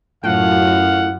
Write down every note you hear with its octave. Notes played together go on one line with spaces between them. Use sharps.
F#2 A2 F4 F5 F#5